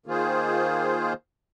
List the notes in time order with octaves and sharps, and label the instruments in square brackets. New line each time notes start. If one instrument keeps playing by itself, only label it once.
[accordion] D#3 A#3 F4 G#4 C5